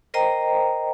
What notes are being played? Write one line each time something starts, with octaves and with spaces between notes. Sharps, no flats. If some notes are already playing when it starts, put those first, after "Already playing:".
A#4 C5 D#5 G5 A#5